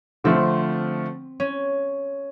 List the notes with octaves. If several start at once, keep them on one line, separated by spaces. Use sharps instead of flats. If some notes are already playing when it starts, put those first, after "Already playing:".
D3 F3 A3 C4
C#4